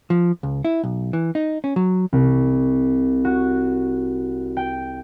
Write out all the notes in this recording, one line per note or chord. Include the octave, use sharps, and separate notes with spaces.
F3
C#2
E4
B1
E3
D#4
C#4
F#3
C2
F#4
G5